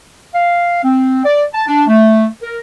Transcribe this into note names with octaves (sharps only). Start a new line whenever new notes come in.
F5
C4
D5
A5
D4
A3
A#4